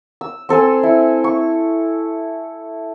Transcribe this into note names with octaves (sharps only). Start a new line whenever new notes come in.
E6
C4 A4 C5 G#5
E4
C#6